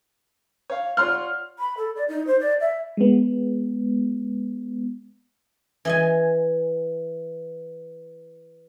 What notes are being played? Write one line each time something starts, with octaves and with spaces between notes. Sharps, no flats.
C#5 F5
F4 C#5 D5 F#5 C6 F6
B5
A4
D5
D#4
C5
D5
E5
G#3 B3
E3 D#5 G#5